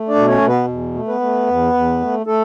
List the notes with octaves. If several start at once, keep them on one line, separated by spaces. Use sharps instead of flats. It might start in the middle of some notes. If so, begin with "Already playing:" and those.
Already playing: A3
D4 D5
B2
C#4 C#5
B2
B3 B4
E2
A3
B3 B4
A3
E2
E2
A3
A3 A4